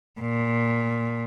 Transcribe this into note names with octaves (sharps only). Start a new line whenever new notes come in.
A#2